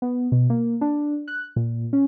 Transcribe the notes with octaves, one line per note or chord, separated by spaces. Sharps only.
B3
B2
A#3
D4
F#6
A#2
C#4